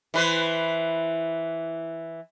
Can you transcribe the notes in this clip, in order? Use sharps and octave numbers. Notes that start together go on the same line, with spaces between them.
E3 B4 C5